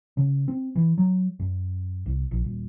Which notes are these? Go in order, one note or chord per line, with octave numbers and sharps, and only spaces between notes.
C#3
C4
E3
F#3
F#2
C2
A#1
D#1